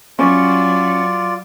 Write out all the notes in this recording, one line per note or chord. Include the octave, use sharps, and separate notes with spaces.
F#3 C#4 F4 D5